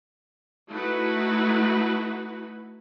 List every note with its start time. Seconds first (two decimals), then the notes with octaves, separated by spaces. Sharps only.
0.69 A3 D#4 E4 F#4 B4